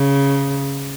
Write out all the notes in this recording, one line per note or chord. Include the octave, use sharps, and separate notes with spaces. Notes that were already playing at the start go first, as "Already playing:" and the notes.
Already playing: C#3